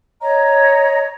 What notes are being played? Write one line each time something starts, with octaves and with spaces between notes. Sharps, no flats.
C#5 D#5 A#5